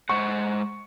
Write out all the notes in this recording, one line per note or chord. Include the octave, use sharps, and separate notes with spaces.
G#3 C5 F#5 C#6